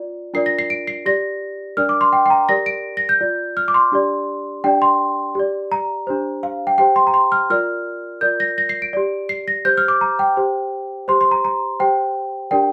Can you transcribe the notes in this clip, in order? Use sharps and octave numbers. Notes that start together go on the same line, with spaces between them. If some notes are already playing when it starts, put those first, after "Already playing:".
Already playing: F4 D5
D4 F4 A#4 D5 C7
A#6
C7
D7
C7
G4 D5 A#6
D4 A#4 D5 F6
D6
C6
G5
G5
A#5
G4 A#4 D5 A#6
D7
A#6
G6
F4 D5
F6
D6
C6
D4 G4 D5
D4 G4 D5 G5
C6
G4 D5
A#5
D4 G4 C5
F5
G5
G4 C5 G5
C6
A#5
C6
F6
F4 A#4 D5 F6
F4 A#4 D5 G6
A#6
A#6
C7
D7
G4 D5
C7
A#6
G4 C5 G6
F6
D6
A#5
G5
G4 C5
G4 C5 C6
C6
A#5
A#5
G4 C5 G5
D4 G4 A#4 D5 G5